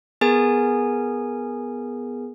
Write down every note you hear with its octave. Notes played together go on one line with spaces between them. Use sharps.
B3 G#4 A#4 G#5